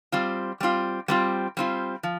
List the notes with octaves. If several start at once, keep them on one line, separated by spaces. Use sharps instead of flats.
G3 C4 F4
G3 C4 F4
G3 C4 F4
G3 C4 F4
F3